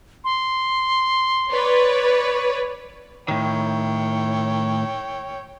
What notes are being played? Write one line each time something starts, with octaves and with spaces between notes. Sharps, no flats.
C6
B4 C#5 D5
A2 D#3 C#5 G5